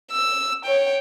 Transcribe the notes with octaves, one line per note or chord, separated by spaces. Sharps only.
E6
C#5 G5